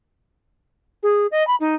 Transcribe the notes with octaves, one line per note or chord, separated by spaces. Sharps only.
G#4
D#5
B5
D#4